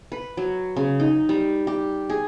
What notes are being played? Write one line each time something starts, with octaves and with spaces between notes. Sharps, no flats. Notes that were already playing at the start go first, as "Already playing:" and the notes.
B4
F#3
C#3
D#4
G3
G4
G#4